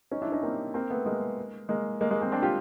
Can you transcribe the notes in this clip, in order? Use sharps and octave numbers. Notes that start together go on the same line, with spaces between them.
C#4 D#4
D4 E4
C#4 D#4
A#3 C4
A#3 C4
A3 B3
G#3 A#3
G#3 A#3
G#3 A#3
G#3 A#3
A#3 C4
C4 D4
F4 G4